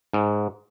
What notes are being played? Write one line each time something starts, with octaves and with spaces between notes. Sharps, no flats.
G#2